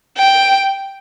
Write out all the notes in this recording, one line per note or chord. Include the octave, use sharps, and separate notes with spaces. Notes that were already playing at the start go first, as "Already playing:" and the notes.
G5